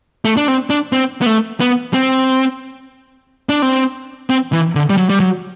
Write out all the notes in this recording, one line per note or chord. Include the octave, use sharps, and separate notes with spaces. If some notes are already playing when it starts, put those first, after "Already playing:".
A3
D4
C4
D4
C4
B3
A3
B3
C4
D4
C4
C4
E3
D3
G3
F#3
G3
F#3